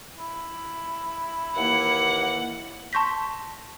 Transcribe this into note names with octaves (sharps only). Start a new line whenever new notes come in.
E4
D#2 E3 A#3 F#5
A5 C6 C#6 G6 A#6 B6